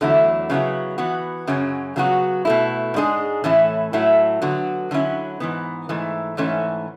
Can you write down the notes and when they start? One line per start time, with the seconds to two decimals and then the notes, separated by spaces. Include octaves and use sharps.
0.01 E2 D3 F#3 A3 E4
0.50 C#3 F#3 B3 E4
0.98 E3 B3 F#4
1.47 F#2 C#3 F#3 C#4
1.96 C#3 F#3 B3 F#4
2.45 B2 A3 E4
2.94 G#2 G#3 D4 G#4
3.44 A2 E3 A3 C#4 E4
3.93 A2 F#3 A3 E4
4.42 D3 F#3 B3 F#4
4.91 D3 F#3 C#4 E4
5.40 G#2 E3 B3
5.89 G#2 E3 A3
6.37 G#2 E3 A3 C#4